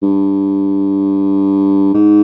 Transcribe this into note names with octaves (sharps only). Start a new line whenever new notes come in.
G2
G#2